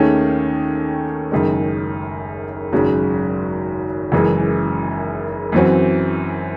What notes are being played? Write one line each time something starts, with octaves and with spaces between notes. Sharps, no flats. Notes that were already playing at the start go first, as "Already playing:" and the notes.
Already playing: D#2 D#3 A3 C#4 G#4
F#1 F#2 D#3 G#3
G#1 F#2 C#3 F#3
F#1 F#2 E3 G#3
F#2 E3 C4 F#4